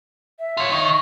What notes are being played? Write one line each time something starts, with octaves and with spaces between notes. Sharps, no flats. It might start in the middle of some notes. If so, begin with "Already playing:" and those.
E5
F4 C#5
D#3 C#6